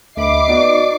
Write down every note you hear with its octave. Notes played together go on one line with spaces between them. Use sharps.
D2 D#5 E5 B5 D6 C7
B3 D#4 F#4 D5